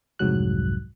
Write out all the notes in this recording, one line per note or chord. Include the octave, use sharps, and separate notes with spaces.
C2 F2 G#2 F#3 F#6